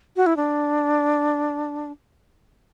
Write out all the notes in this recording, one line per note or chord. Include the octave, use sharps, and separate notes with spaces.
F#4
E4
D4